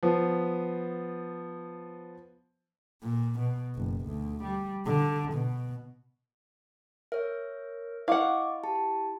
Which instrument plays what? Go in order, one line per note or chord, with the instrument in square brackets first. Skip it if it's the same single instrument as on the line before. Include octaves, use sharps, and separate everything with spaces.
[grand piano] F3 B3
[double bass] A#2
B2
F#1
D2
G3
D3
B2
[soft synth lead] A#4 [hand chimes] C#5 E5
[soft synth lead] E4 [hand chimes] D#5 C#6 D6 [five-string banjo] F5 F#5
[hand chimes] G4 A5